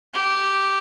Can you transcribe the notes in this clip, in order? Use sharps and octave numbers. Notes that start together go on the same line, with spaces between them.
G4